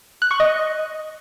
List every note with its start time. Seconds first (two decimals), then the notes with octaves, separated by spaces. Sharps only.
0.22 F#6
0.31 C#6
0.40 D#5